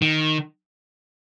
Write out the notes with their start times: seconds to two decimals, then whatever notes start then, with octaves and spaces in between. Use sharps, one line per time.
0.02 D#3